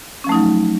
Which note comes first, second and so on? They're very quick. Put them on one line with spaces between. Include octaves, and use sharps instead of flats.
C#4 F3 A3 D#4 F#3